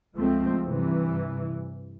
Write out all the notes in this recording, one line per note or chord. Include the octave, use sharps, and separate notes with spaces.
C#2 F3 G#3 A3 C4
G2 C3 E3